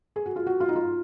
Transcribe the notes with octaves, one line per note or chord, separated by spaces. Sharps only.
G#4
F#4
F4
F#4
F4
D#4
F4